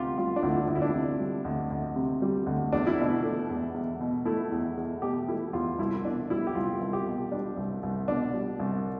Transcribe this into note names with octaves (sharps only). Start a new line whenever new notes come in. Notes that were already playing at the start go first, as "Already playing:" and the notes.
Already playing: D2 C3 F4 G4
G3 F4
D4
D2 E4
D2
E4
D4
C3
G3
D2
D2
C3
G3
D2
E2 D4
E4
B2 D4
A3
E2
E2
B2
A3 E4
E2
E2
B2 G4
A3 E4
E2 F4
C2 E4
B2 D4
G3 E4
G4
C2 F4
C2
G4
B2
G3 D4
C2
C2
B2 D4
G3
C2